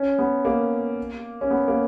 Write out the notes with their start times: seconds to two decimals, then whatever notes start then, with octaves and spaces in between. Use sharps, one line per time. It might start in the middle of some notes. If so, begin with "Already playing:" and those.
Already playing: C#4
0.19 B3
0.45 A#3
1.41 C#4
1.50 B3
1.68 A#3